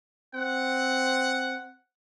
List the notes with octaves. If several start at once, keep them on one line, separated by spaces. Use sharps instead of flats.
C4 F#5